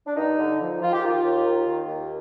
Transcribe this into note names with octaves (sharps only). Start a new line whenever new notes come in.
D4
G2 D#4
D3
F3
D#3 F4
G4
D#3 F4
D#2
D#3
D#3
D#2